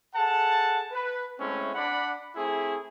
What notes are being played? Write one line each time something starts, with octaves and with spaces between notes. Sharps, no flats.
G#4 A4 F#5 A5
B4
G#3 A3 C4 C#4 E4
D4 D5 F#5 B5
A3 C4 E4 G#4